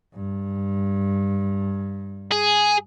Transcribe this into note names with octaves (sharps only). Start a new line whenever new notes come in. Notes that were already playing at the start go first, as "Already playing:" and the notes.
G2
G#4